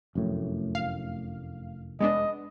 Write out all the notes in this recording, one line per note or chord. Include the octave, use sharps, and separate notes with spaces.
F1 F#2 A2
F5
G#3 B3 D4 D#5